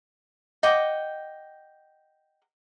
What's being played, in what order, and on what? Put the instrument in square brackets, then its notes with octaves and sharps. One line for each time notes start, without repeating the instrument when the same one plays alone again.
[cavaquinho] D#5 F#5 G5 D6